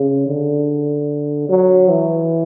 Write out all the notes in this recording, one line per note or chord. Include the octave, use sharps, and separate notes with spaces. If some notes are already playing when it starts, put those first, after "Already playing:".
Already playing: C#3
D3
F#3
E3